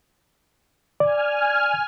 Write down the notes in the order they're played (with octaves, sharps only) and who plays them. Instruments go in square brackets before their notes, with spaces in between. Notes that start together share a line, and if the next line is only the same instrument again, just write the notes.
[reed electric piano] D5 [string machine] G#5 F6